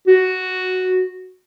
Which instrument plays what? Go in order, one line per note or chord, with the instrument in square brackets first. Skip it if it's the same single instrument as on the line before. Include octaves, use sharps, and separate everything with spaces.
[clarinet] F#4